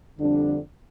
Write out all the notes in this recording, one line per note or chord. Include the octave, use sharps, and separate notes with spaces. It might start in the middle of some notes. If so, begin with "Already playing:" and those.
F2 D3 G3 D4